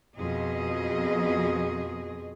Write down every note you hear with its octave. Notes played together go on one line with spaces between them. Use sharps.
F2 B2 G#4 D#5